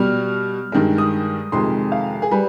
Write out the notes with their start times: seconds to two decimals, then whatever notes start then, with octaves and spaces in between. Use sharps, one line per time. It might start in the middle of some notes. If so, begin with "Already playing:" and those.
Already playing: B2 G3 F6
0.72 G2 D#3 G#3
0.98 D#6
1.52 F2 C3 D#3 G#3 C6
1.92 F5
2.22 G#4
2.31 G3 B4